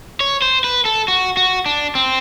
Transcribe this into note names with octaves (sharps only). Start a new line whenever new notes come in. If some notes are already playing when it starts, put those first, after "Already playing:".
C#5
C5
B4
A4
F#4
F#4
D4
C4